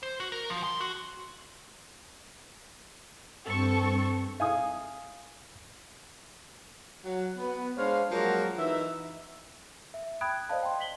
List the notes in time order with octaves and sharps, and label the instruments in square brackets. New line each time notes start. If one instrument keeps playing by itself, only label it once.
[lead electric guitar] C5
F#4
A#4
F3
C6
F#4
[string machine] G2 C4 [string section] A4 C#6
[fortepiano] F5 G#5 D#6
[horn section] F#3 F#5
B3 B4
G#3 D4 C5 C#5 F5
F3 F#3 G#3 A#3 F#4 A#4
E3 D#4 E5
[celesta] E5
G5 B5 D#6 F#6 G#6 D7
F#6
C5 D5 D#5 F5 A5
G5 C6
B6 F#7 G7